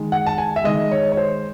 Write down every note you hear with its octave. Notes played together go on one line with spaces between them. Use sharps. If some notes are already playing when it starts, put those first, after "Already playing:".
Already playing: D#3 G#3
F#5
A5
G#5
E5
D#3 G#3 D#5
C#5
C#5
C5